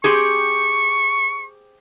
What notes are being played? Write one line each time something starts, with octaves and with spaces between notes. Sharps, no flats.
C4 G4 G#4 C#6